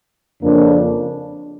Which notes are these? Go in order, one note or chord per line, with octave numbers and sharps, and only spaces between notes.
F2 C#3 F3 A#3 D4